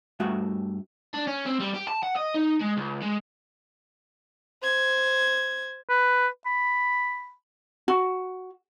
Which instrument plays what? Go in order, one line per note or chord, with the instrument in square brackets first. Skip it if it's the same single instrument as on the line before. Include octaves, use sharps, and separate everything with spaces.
[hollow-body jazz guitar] G2 A3 F#4 E5
[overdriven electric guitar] D4
C#4
C4
G3
G4
A5
F#5
D#5
D#4
G#3
C#2
G#3
[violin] C5 G#6
[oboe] B4
B5
[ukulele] F#4